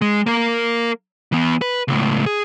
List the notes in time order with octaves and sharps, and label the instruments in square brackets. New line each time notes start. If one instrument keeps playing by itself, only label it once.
[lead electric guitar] G#3
A#3 A#4
E3 B3
B4
C#2 A2
G#4